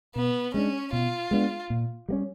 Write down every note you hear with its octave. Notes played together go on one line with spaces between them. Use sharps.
B2 B3
G#3 B3 C#4 D4
B2 F4
G#3 B3 D4
A#2
G3 A#3 C#4